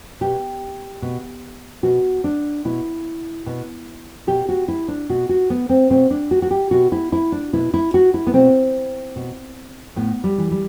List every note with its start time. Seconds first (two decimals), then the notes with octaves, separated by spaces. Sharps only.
0.21 B2 G4
1.02 B2
1.83 B2 F#4
2.24 D4
2.65 B2 E4
3.46 B2
4.27 B2 G4
4.49 F#4
4.68 E4
4.88 D4
5.09 B2 F#4
5.29 F#4
5.50 B3
5.69 C4
5.90 B2 C4
6.11 D4
6.31 F#4
6.42 F#4
6.51 G4
6.71 B2 F#4
6.92 E4
7.12 E4
7.32 D4
7.53 B2 E4
7.74 E4
7.94 F#4
8.14 E4
8.27 B3
8.34 B2 C4
9.16 B2
9.96 A2 B3
10.24 G3
10.38 E3
10.51 G3